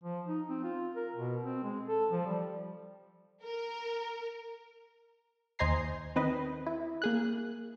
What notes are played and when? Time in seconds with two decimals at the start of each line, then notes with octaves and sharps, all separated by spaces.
0.04 F3
0.27 D#4
0.49 C4
0.64 F4
0.96 A#4
1.16 B2
1.43 C4
1.64 G#3
1.88 A4
2.11 F3
2.26 G3
3.43 A#4
5.59 D#2 C5 D#5 G#5 A#5 C7
6.16 D#3 C4 B4 D#5
6.67 E4
7.02 A#3 G#4 F#6